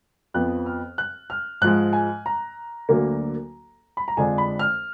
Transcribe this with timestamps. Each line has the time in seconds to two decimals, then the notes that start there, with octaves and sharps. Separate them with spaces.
0.34 F2 F3 B3 F#6
0.66 F6
0.98 F#6
1.30 F6
1.61 G#2 F3 G#3 F#6
1.93 G#5
2.26 A#5
2.89 D2 D3 F#3 A#3
3.97 B5
4.08 A#5
4.17 F2 D3 G#3 D4 F4 G#5
4.38 B5
4.59 F6